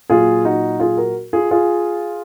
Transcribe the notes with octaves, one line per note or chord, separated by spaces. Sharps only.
A#2 F#3 F4 G#4
D#4 F#4
F4 G#4
F#4 A#4
F4 G#4
F4 G#4